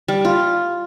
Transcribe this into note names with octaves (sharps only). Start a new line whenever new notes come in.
G3
F4